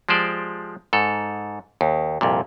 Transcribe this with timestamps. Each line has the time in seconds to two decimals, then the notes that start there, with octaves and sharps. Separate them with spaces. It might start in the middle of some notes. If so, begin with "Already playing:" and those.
0.09 F3 G#3 G4 C5 D5
0.93 G#2 A4
1.81 D#2
2.21 C2 F2 A#2